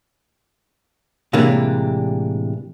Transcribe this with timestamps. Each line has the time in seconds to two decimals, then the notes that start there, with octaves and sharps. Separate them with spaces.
1.33 A2 C3 E3 G#3 A#3 D4